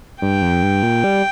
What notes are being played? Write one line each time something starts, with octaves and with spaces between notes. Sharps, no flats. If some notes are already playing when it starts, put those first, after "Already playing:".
G2 G5
F2
G2
A#2
G3